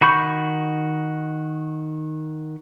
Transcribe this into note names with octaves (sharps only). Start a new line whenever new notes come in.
D#3 F#4 B5 C#6 G6